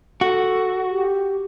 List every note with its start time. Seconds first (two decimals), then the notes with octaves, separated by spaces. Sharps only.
0.21 F#4 A4
0.89 G4